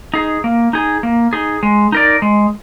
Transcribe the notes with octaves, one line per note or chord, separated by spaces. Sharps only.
D#4 G#4
A#3
D#4 G#4
A#3
D#4 G#4
G#3
D#4 A#4 D5
G#3